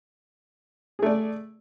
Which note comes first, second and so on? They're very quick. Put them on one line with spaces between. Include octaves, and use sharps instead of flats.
G#4 A3 D5